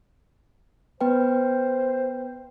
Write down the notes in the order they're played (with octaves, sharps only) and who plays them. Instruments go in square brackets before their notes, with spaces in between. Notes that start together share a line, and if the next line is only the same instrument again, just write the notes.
[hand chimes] B3 B4 G5 [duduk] C5